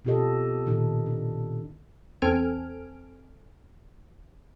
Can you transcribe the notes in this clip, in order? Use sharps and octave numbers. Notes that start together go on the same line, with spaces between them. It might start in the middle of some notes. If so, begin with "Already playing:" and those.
B2 C4 F4 G4 A4 D#5
A#2 D#3 D#4 A4
D4
E2 C4 A4 G#5 F6 D7